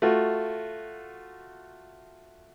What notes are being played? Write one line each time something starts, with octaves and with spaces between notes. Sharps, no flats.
A3 F4 F#4